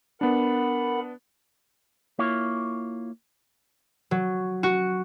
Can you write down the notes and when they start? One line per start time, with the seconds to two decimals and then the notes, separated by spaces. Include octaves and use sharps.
0.21 B3 D4 A#4 F#5 B5
2.19 A#3 E4 F4 C#5
4.11 F#3
4.63 F#4